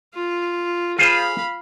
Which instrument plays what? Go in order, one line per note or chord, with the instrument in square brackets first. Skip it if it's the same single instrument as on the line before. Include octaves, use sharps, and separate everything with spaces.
[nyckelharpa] F4
[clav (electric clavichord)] F4 G#4 C5 [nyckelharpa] F5 B5